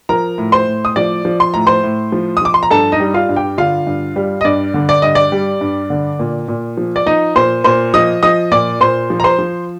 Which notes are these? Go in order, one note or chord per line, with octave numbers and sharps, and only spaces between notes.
F3 A#4 A#5
A2
C5 C6
A2
D#6
F3 D5 D6
F3
C6
A2 A#5
C5 C6
A2
F3
D#6
F3 D6
C6
A#5
G2 A4 A5
D#4 D#5
G3
F4 F5
G2
G4 G5
D3 F4 F5
G2
G3
D#5
G2 D5
D3
D5
G2 D#5
D5
G3
G2
D3
A#2
A#2
F3
D5
F3 D#4 D#5
A#2 C5 C6
A#2 C5 C6
F3 D#5 D#6
F3 D#5 D#6
A#2 D5 D6
A#2 C5 C6
F3
A#5
C5 C6
F3